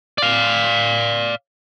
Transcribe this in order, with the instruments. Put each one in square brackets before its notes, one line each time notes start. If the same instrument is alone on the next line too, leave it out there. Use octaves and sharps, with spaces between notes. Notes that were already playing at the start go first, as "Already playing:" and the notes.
[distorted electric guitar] D5 F5